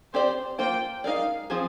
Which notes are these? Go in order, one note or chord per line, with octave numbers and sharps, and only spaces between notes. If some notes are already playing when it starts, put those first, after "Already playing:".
C4 G4 C5 D5
A#3 F4 C5 G5
G#3 D#4 A#4 D5 F5
F3 C4 F4 G#4 C5